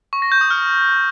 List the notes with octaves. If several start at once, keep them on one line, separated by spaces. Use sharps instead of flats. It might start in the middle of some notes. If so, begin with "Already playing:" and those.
C#6
A#6
G6
D#6
F6